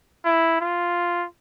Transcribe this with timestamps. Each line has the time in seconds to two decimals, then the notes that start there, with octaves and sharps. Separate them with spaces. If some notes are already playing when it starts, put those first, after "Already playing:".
0.25 E4
0.61 F4